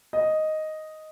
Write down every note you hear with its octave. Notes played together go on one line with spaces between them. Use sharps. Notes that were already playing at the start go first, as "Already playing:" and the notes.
D#5